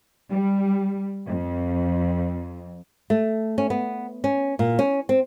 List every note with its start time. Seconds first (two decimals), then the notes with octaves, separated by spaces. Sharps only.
0.29 G3
1.27 F2
3.10 A3
3.58 C#4
3.70 B3
4.24 C#4
4.59 A#2
4.79 C#4
5.09 C4